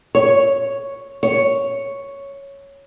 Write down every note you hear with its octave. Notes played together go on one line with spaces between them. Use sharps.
C#5
C#5